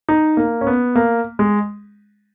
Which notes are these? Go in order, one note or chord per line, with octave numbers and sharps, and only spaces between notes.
D#4
A#3
C#4
B3
A#3
G#3